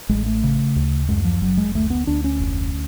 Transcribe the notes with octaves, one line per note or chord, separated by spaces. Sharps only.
A1 G#3
A3
C#3
D2
F#2 G#3
F3
F#1 F#3
G#3
D2 A3
B3
D2 D4
C#4
F1